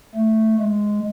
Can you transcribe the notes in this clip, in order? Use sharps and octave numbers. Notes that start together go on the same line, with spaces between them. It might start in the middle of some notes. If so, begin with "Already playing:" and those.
A3
G#3